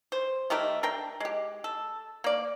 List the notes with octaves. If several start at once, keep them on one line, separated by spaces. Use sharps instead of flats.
C5
D#3 A3 G4 A#4
D4 A#4 G5
G#3 G4
A4
A#3 D5